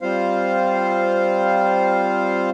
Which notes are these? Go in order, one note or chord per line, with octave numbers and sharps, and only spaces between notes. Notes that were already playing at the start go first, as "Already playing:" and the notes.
G3 C4 F4 C5 F5